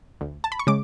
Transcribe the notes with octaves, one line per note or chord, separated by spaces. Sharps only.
D2
A5
B5
C#6
C#3 G#3 D6